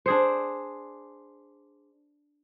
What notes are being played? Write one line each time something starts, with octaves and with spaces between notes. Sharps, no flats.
D4 G#4 C5